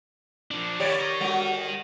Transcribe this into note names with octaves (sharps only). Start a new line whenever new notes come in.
F3 D4
D#2 E4 G4 C#5 D5
A#4 D#5
G3 F#4